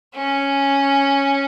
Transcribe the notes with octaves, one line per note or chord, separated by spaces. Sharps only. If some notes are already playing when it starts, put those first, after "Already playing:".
C#4